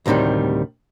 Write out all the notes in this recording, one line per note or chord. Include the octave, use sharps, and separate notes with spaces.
D2 A2 C3 D#3 G3